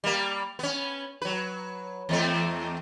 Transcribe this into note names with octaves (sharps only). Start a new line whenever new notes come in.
G3 A#3
B3 C#4
F#3 B4
E2 A3 C4